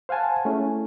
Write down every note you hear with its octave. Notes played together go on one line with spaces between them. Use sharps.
C5 F5 F#5 G#5 A5
A3 C#4 E4 G#4